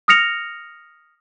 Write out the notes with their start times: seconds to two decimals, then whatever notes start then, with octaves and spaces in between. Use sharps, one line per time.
0.08 D#6 F6 A#6 C#7 F7